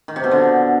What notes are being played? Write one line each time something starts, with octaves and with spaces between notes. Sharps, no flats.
D#3
C3
B2
D3